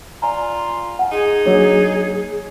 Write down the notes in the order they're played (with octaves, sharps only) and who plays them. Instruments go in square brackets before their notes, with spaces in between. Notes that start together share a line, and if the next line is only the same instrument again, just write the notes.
[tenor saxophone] F4 [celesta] D5 G#5 A#5
[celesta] F#5 G#5
[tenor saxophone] D#4 [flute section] G#4
[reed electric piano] F#3 A#3 [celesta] D4 C#5